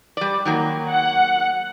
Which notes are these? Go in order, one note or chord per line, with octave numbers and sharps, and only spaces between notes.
G3 D5
D#3 F#3 A#3
F#5